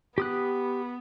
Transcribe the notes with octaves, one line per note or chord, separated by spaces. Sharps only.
B3 G4 D#6 F#6